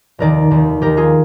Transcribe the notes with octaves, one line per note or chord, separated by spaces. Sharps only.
F1 D#2 D#3 A#4 D5
F1 D#2 D#3
D#2 D#3 G4 A#4
F4 G#4